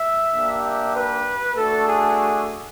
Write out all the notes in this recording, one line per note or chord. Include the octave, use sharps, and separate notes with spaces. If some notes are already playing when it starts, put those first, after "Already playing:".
Already playing: E5
A#3 D4 G4
E5
B4
A3 D4 F#4 A4
G#4